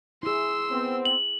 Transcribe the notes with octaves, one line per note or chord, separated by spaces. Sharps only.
E4 G#4 C6 E6
B3 C4
F#7